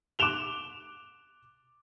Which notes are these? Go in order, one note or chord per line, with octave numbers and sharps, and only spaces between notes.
D6 F#6 D7 E7 F7 G7